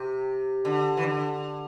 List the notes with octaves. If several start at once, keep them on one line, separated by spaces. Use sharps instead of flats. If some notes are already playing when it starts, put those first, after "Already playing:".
Already playing: C3
D3
E3
D3